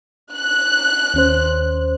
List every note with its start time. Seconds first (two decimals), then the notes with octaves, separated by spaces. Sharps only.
0.34 F#6
1.14 D#2 C#4 C5